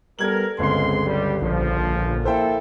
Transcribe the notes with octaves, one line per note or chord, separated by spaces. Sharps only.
G3 B3 A4 A#4 G#6 F#7
G1 C#2 G#3 C4 C6
G3
A#1 F3
A#3 E4 A4 C5 E5 G5